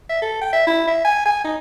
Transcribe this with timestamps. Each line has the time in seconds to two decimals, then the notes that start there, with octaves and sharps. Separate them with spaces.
0.09 E5
0.22 A4
0.41 G5
0.53 E5
0.67 E4
0.87 E5
1.04 G#5
1.25 G#5
1.45 D#4